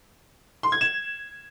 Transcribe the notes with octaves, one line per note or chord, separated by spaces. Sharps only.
C6
G#6
E7